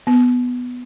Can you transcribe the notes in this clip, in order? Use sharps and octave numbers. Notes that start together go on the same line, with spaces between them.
B3